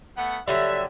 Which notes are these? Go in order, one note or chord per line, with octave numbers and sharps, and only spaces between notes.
A3 B3 F#5
D3 F#3 G3 E5